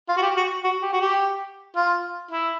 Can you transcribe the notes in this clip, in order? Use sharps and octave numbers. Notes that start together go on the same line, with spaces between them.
F4
F#4
G4
F#4
F#4
G4
F#4
G4
F4
E4